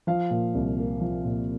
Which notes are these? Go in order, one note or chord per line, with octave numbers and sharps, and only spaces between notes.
F3 F5
A#2
C2
A#3
F3
A#2